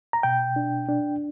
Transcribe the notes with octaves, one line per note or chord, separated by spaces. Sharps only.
A#5
B2 G5
D4
D4